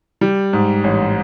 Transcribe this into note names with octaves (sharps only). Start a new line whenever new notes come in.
G3
G#2
A1